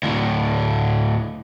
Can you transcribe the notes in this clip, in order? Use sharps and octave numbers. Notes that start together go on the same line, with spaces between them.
D2 A2